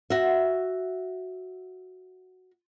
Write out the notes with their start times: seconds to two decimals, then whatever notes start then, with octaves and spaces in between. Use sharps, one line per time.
0.10 F#4 E5